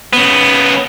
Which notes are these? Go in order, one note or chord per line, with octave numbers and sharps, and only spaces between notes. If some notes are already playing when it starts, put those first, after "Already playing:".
C#3 B3